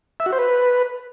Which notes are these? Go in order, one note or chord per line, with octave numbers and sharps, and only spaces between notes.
E5
F#4
C5
B4